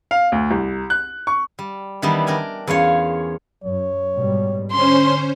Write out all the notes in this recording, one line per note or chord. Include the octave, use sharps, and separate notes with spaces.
F5
D2
C2
F#6
C#6
G3
D#3 E3 G3 B3 D4
D4 A#4 G5 G#5
E2 C#4 F4 C#5
F#2 C#5
G#2 B2 G3
D3 C#4 C5 C6